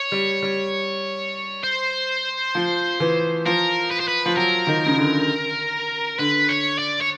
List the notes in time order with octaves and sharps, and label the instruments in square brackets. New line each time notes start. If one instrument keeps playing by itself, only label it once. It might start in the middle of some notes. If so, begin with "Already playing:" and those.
Already playing: [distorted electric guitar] C#5
[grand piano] G3
G3
[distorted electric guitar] C5
[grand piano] F3
E3
[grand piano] F3 [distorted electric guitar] A#4
[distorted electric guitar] B4
C5
B4
[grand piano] F3
[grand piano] F#3 [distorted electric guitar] A#4
[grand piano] D#3
C#3
D3
[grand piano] D3 [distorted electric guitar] B4
[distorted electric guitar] C#5
D5
C#5